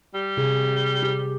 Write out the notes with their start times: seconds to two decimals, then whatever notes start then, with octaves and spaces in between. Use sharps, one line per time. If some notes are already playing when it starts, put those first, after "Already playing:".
0.14 G3
0.37 C3 G#4
1.03 G4